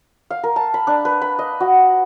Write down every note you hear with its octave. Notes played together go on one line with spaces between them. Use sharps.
F5
A#4
A5
B5
D4
B4
B5
D#5
F#4